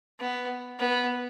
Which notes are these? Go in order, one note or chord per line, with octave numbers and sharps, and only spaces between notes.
B3
B3